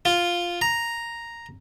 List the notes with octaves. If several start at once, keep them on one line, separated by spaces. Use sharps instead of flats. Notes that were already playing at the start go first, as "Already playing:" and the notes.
F4
A#5